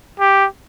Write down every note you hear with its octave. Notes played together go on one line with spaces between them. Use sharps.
G4